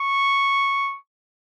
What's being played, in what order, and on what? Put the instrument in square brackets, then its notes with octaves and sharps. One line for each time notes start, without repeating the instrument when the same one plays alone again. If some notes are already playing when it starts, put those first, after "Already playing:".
Already playing: [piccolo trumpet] C#6